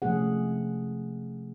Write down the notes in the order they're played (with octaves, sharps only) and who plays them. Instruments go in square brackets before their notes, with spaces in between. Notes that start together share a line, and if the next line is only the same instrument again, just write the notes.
[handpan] C3 F3 A3 C#4 G#4 F#5